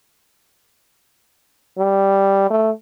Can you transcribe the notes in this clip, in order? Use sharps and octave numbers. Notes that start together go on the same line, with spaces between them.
G3
A3